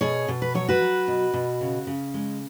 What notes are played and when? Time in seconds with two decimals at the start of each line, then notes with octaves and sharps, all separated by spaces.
0.01 B2 G#4 C#5
0.28 B2
0.42 B4
0.55 F#3 C#5
0.69 F#4 B4
0.81 F#3
1.08 B2
1.34 B2
1.61 C#3
1.87 C#3
2.14 G#3